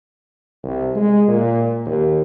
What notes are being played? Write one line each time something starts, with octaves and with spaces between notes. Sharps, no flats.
C2
G#3
A#2
D#2